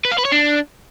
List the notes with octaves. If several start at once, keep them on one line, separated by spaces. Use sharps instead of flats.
B4
F5
B4
C#5
D4